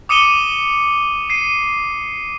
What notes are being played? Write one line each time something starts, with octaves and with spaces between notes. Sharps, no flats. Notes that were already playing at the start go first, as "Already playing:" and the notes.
D6 D#6 C#7 D#7 E7 G7
C7 D#7